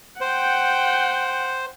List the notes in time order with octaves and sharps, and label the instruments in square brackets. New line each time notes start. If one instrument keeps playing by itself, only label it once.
[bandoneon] C5 [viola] F#5 G5